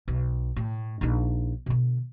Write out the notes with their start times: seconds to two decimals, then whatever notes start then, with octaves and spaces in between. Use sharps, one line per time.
0.08 B1
0.56 A2
1.01 A#1 D#4
1.66 B2 D3